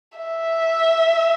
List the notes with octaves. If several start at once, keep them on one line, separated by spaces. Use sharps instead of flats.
E5